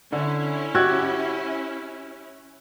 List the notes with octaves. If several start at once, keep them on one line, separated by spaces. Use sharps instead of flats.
D3 C#4 E4
F#4 G4 E6 F#6 G#6